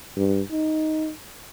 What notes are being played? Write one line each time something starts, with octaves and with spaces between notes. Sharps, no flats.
G2
D#4